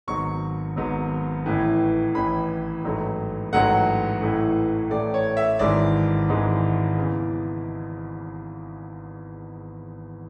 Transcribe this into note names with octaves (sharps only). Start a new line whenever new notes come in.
G#1 G#2 F#3 B3 C#6
G#1 G#2 F#3 B3
A1 A2 E3
A1 A2 E3 B5
A1 G#2 F#3 A3
A1 G#2 F#3 A3 F#5
A1 A2 E3 A3
A1 A2 E3 A3 D5
C#5
E5
G#1 G#2 E3 G#3 D5
G#1 G#2 E3 G#3
E2 C#3 E3